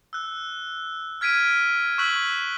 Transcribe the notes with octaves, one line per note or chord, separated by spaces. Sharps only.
E6 F#6
F6 G#6 B6 D7 D#7
C#6 E6 F#6 B6 F#7